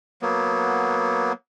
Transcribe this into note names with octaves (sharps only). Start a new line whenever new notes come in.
F#3 A#3 B3